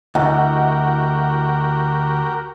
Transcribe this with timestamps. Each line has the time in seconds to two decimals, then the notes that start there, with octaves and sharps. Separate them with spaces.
0.15 D2 E4 F#4 G4 A#4 D#5 F#5